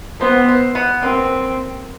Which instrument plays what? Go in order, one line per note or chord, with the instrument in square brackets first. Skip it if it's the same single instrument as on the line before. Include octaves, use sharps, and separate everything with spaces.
[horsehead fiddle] B3 [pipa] C4
[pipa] C4
B3
[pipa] A#3 [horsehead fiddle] C4